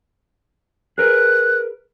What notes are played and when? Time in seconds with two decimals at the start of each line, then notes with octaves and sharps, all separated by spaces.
0.98 G#4 A#4 B4 F#6